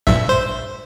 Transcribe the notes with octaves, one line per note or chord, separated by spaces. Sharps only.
A#1 G2 E5
C5